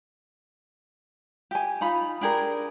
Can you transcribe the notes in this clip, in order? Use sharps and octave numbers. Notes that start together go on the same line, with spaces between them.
G4 G#5
D#4 F4 B5
D4 G4 G#4 A#4